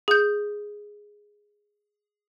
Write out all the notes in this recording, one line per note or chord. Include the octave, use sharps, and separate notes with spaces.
G#4 G6